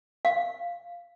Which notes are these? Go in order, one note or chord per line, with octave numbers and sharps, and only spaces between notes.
F5